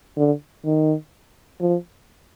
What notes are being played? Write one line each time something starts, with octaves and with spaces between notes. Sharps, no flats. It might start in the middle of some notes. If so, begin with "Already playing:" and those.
D3
D#3
F3